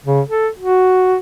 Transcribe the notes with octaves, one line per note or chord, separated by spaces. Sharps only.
C#3
A4
F#4